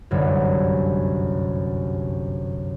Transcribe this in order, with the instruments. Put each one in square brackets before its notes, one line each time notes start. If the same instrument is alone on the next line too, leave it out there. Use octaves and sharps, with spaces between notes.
[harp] G1 C2 F#2